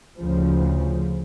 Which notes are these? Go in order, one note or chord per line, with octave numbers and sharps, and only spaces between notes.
D2 C#3 F3